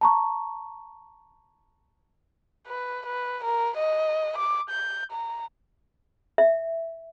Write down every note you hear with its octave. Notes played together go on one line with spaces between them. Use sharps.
A5 A#5 C#6
B4
B4
A#4
D#5
D6
G6
A#5
E5